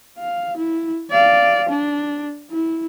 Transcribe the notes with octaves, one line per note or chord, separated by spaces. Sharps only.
F5
E4
D5 F5
D4
E4